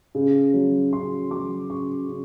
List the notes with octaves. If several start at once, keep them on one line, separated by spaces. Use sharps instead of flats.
C#3
F#3
C#3 C6
F#3 D6
C#3 C#6
C#3